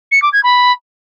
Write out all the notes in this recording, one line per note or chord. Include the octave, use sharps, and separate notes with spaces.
C#7
D6
G#6
B5